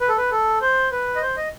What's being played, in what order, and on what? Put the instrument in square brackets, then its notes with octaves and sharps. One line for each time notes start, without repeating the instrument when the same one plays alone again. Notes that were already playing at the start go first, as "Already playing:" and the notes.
[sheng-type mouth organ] B4
A4
B4
A4
C5
B4
D#5
C5
D#5